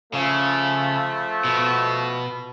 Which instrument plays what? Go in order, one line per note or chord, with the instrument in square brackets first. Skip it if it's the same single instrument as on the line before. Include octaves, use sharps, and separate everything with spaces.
[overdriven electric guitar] C#3 [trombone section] F3 A3
[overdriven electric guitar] B2